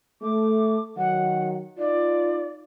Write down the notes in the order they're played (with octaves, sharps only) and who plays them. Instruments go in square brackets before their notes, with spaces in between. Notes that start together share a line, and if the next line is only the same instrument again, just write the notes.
[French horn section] A3 [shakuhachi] D6
[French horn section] D#3 F#3 [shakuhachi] F#5
[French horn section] D#4 F4 [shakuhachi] D5